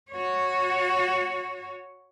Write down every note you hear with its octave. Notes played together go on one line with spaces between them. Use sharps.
F#4 C#5